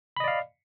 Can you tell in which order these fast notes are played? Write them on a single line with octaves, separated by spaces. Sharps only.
B5 D#5 D5 F5